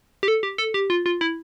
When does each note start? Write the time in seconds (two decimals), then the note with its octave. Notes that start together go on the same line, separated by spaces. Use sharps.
0.23 G4
0.28 A4
0.43 G4
0.58 A4
0.74 G4
0.90 F4
1.06 F4
1.21 E4